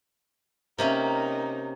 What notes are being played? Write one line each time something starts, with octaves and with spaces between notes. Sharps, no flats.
C3 A#3 C#4 D#4 A#4